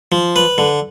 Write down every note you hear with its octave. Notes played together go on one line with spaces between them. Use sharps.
F3
B4
D3